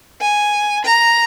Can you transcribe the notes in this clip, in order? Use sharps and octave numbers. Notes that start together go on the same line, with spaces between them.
G#5
A#5